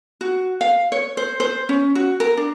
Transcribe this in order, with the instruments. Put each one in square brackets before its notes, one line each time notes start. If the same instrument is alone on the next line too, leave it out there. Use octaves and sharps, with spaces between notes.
[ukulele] F#4
F5
C#5
C5
C5
C#4
F#4
A#4
D4